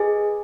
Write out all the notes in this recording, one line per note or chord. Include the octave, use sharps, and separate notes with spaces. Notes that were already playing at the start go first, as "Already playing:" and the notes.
Already playing: G#4 B4 D#5 G#5